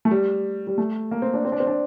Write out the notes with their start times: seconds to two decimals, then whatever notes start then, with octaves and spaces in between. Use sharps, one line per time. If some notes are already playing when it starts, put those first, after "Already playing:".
0.05 A3
0.11 G3
0.67 G3
0.78 A3
1.11 A#3
1.22 C4
1.34 D4
1.45 C4
1.52 D4
1.60 C4
1.67 D4